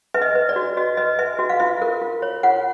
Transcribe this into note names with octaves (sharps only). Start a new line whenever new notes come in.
B4 E5
D#5
B4
D5
F#4
F#4 D#5
B4 D#5
B4 E5
F#4 E5
F5
F4 E5
A#4
F4
C#5
F4 F#5